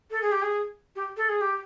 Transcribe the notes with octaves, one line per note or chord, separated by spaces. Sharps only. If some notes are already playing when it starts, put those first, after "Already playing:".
A4
G#4
G4
G#4
G4
A4
G#4
G4